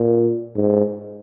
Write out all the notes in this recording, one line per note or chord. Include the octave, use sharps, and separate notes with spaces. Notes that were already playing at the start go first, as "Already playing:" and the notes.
Already playing: A#2
G#2